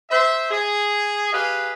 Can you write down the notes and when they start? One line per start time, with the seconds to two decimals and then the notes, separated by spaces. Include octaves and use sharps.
0.10 C5 E5
0.50 G#4
1.33 G4 G#4 B4 D#5 F5